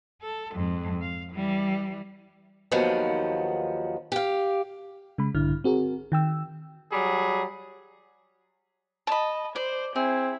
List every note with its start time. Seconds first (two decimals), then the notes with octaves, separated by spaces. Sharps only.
0.22 A4
0.54 F2 G#2
1.02 F5
1.32 E3 G3
2.71 D#2 D#3 F3 F#3 B3
4.12 G4 F5
5.18 C#3 G#3 B5
5.35 A#1 G2 D3 E4 F6
5.64 C4 F#4 G#4 A#4
6.12 D#3 G5 E6
6.92 F#3 G3 G#4
9.07 D#5 A5 B5
9.56 C5 D5
9.96 C4 E4 G#4